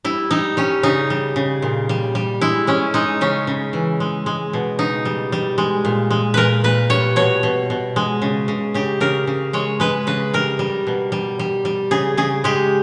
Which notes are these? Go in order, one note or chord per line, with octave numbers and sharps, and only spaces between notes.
G3 E4
G3 D#4
G3 C#4
C#3 D#4
G3
C#3
A#2
G3
G3
G#3 E4
G#3 C#4
G#3 D#4
C#3 C#4
C#3
E3
G#3
G#3
B2
C#3 D#4
G3
G3
G#3
A#2
G#3
A#2 A#4 B4
A#2 B4
G3 C#5
B2 C#5
B2
B2
G#3
C#3
C#3
C#3 G4
C#3 A#4
C#3
G#3 C#5
G#3 B4
C#3 B4
G3 A#4
G3
B2
G3
G3
G3
C#3 G#4
C#3 G#4
G#3 G4